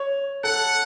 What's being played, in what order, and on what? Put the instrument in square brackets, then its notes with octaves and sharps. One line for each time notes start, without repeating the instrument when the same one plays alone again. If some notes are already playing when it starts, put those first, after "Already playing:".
Already playing: [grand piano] C#5
[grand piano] A4 [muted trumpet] F#5